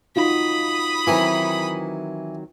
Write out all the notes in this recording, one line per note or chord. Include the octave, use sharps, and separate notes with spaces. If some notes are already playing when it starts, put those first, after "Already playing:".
D#4 F4 F#4 B5 D#6
D#3 E3 F#3 C4